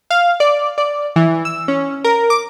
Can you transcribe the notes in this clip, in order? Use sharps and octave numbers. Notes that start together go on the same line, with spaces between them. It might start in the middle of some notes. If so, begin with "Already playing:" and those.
F5
D5
D5
E3
E6
C#4
A#4
D6